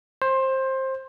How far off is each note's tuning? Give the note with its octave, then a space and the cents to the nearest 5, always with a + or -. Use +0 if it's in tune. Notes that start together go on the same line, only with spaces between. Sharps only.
C5 +20